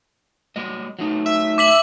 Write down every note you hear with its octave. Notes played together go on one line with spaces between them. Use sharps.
F#3 G3 D#5
F#3 A3 D#4
E5
D6 B6 F#7